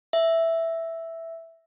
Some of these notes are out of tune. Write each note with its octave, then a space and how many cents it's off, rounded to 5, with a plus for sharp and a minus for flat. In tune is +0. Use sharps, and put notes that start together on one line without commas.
E5 +0